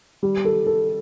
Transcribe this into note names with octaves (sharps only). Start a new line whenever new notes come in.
G3
A4
A4